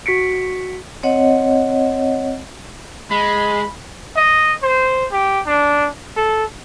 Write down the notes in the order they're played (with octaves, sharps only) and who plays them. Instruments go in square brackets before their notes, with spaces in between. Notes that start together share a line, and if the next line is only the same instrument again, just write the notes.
[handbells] F#4 B6 C#7 D7
[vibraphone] C4 C#5 D#5 F#5
[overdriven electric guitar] G#3 [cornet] B5
[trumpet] D#5
C5
G4
D4
A4